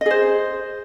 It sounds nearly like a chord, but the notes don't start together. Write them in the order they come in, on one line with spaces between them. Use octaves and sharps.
D#5 G#4 C5